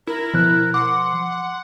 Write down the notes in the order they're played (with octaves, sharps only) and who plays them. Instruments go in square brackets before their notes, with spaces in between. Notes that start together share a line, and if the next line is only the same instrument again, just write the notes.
[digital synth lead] E4 [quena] A#4
[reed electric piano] B2 F#6 [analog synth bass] F3
[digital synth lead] F#5 [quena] C6 [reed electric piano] D6
[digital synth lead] F#5